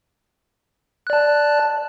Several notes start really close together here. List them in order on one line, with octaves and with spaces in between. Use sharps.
F#6 D5 A5